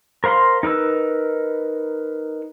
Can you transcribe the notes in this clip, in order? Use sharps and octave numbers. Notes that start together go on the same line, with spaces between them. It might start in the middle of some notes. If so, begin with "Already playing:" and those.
A#4 C5 F5 B5 C6
D#4 A#4 B4 E6